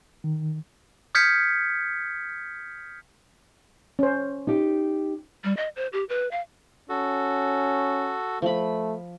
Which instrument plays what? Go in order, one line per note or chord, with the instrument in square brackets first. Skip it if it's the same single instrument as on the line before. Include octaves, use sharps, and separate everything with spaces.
[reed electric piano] D#3
[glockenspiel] D#6 F6 G6 G#6 B6 C#7
[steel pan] C#4 C5
[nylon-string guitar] D#4 G4
[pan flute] G3
D#5
C5
G4
B4
F5
[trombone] C#4 [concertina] F#4 A4
[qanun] F3 B5 [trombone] A3